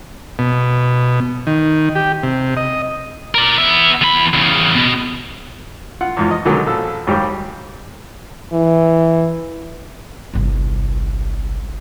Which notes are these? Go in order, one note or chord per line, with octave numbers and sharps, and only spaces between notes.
B2
D#3
G4
C3
D#5
A#4 D5
B3 E5
E2 B5
E2 C#3
B2
F4 F#5
E2 G#2 F3
D#5
B2 D3 D#3 F#3 G#3
A#1 A4
D#2 G#2 F#3 G3 G4
E3
G1 C2